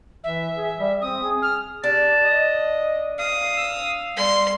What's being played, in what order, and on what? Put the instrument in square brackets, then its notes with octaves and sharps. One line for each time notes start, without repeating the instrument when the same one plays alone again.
[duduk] E3 [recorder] E5
[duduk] G#4
G3
[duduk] C4 [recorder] D#6
[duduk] G#4
[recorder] F6
[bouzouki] D4 [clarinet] G4 [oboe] A5
[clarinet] D#5
[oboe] F5 [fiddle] D#6
[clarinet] E6
[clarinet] G3 [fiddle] C6